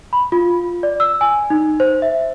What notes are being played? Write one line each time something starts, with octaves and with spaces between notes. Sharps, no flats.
B5
F4
D5
E6
G#5
D#4
C5
E5